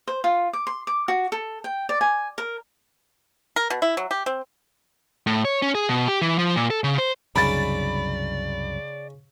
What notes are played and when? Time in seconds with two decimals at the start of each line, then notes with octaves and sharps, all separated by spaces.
0.07 C5
0.24 F4
0.53 D6
0.67 C6
0.87 D6
1.08 F#4
1.32 A4
1.64 G5
1.89 D5
2.01 G#5
2.38 A#4
3.56 A#4
3.70 B2
3.82 E4
3.97 F#3
4.11 G4
4.26 C4
5.27 A2
5.45 C#5
5.62 C#4
5.75 G#4
5.89 B2
6.08 G4
6.22 E3
6.38 F3
6.56 A#2
6.70 A4
6.84 C#3
6.98 C5
7.36 C2 F#2 C#3 C#4 D#4 D5 B5 A6